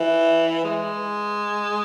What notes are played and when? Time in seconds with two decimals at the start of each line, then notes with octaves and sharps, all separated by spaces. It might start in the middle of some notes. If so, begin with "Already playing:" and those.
Already playing: E3
0.65 G#3